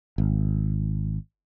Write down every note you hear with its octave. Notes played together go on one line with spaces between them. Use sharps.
G#1